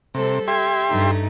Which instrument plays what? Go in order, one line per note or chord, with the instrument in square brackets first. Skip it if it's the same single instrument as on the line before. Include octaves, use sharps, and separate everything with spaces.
[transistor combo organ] C3 [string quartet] G3 A4 C5
[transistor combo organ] G4 E5 C6 [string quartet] G#6
[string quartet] G2 A3 D#4